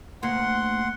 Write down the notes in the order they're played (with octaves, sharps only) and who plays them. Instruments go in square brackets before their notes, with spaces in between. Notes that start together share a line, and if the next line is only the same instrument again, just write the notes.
[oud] D2 A#3 [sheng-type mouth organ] F#5 C6